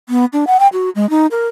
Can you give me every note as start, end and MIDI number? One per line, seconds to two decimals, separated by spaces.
0.09 0.25 59
0.33 0.44 62
0.47 0.57 78
0.60 0.68 79
0.73 0.89 66
0.95 1.09 56
1.10 1.26 63
1.31 1.47 70